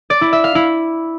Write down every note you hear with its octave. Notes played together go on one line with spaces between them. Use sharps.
D5
E4
E5
F5
E4